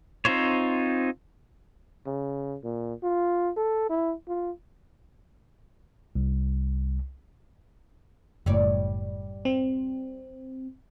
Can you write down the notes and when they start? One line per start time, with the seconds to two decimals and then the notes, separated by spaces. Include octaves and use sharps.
0.25 C4 D#4 F4 C5 C#5
2.06 C#3
2.64 A#2
3.03 F4
3.57 A4
3.90 E4
4.28 F4
6.16 C2
8.46 F#1 A2 G3 C#5 D5
9.45 C4